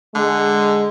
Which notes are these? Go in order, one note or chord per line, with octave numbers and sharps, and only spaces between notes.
D3 G#3